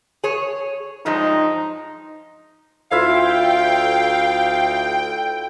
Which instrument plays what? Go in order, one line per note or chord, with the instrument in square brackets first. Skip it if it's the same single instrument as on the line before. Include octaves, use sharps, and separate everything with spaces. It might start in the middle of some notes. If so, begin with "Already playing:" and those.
[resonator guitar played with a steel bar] G#4 C#5
[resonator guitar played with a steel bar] G2 F3 G#3 [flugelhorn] D#4
[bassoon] D2 [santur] E4 F4 E5 [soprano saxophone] F5 [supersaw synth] G5